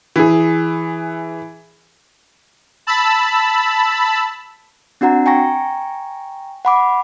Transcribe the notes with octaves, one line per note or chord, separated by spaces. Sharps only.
E3 G#4
A5 B5 E6
C4 D4 F#4 F#5 A#5
G5 G#5 A#5 C#6 A#6
F#5 B5 D6